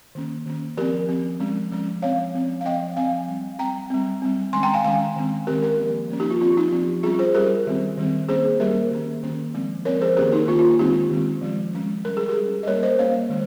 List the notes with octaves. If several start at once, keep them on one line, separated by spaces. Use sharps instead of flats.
D#3 A#3 C#4
D#3 A#3 C#4
F3 C4 G4 A#4
F3 C4
F3 G#3 C#4
F3 G#3 C#4
F3 C4 C#5 F5
F3 C4
F5
F3 C4 D#5 G5
F3 C4 F5 G#5
G3 C4
G3 C4 G5 A#5
G3 C4
G3 C4
D#3 G#3 C#4 G#5 C6
G5 A#5
F5 G#5
D#3 G#3 C#4 F5 G#5
D#3 G#3 C4
D#3 G#3 C4 G4 A#4
G4 A#4
F3 A#3 C#4
F3 A#3 C#4
D#4 G4
F4
F3 C4 F4
D#4 G4
F3 C4
G3 C#4 F4 G#4
G#4 C5
G3 C#4 G4 A#4
D#3 G3 C4
D#3 G3 C4
G3 A#3 C#4 G#4 C5
G3 A#3 C#4 G4 A#4
D#3 A#3 C#4
D#3 A#3 C#4
F3 G#3 C4
F3 G#3 C4 A#4 C#5
G#4 C5
D#3 A#3 C#4 G4 A#4
D#4 G4
D#3 A#3 C#4 F4
F4
D#3 G#3 C4 D#4 G4
D#3 G#3 C4
F3 G#3 C#4
F3 G#3 C#4
G3 C#4 A#4
G#4
G4 A#4
G3 C#4
D#5
G3 A#3 C#4 A#4 C#5
C5 D#5
G3 A#3 C#4 C#5 F5
D#3 G#3